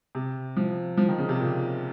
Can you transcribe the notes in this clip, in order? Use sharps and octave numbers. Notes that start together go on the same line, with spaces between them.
C3
F3
F3
D#3
C#3
C3
A#2